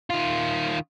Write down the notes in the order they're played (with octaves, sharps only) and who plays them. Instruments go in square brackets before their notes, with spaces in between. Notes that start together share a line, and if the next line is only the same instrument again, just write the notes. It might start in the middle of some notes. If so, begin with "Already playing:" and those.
[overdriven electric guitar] D#3 F4